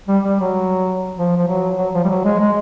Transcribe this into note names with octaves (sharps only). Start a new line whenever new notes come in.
G3
G3
F#3
F3
F3
F#3
F#3
F3
G3
F#3
G#3
G#3